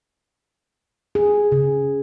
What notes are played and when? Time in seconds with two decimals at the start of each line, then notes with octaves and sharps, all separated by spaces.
1.15 G#4
1.52 C#3